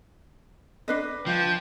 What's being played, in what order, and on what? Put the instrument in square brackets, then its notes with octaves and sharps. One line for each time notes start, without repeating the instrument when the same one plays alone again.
[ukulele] D4 B4 D#5
[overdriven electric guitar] F3 [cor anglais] G5